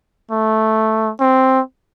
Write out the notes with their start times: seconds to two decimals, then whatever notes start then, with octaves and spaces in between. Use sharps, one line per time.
0.31 A3
1.20 C4